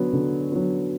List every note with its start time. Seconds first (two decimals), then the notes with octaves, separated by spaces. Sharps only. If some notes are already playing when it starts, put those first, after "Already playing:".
Already playing: D3 F#3 B3
0.13 D3
0.52 F#3 B3